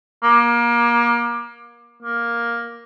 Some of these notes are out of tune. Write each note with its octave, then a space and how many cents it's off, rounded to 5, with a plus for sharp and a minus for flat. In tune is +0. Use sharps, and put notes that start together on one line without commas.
A#3 +30
A#3 +5